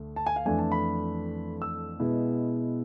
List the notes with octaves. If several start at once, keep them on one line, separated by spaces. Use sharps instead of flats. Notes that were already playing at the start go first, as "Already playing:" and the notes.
Already playing: D2 A3
A5
G#5
F5
F2 E3 A3 D4 G#5
A5
B5
E6
B2 G#3 B3 E4